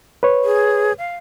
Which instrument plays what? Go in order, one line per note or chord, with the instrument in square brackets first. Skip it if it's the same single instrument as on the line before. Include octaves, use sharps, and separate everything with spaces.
[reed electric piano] B4 C#5
[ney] G#4
F5